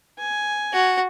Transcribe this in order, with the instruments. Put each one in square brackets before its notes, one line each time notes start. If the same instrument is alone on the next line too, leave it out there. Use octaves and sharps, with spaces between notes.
[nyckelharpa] G#5
[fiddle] F#4